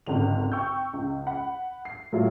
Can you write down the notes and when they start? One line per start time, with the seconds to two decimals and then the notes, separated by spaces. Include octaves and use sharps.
0.06 G#1 C#2 D3 F7
0.52 G5 C#6 E6 G6
0.93 C#2
1.27 F#5 B5
1.85 C7
2.12 A2 F#3 G3 E4 F4